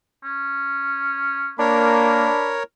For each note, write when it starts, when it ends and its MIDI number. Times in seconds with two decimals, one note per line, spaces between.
0.24 1.53 61
1.59 2.30 58
1.59 2.55 62
1.59 2.63 70
1.59 2.63 73
1.59 2.57 83